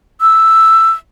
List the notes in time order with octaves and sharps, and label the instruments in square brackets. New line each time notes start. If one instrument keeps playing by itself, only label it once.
[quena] E6